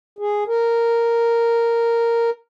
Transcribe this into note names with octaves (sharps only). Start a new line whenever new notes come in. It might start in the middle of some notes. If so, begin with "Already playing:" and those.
G#4
A#4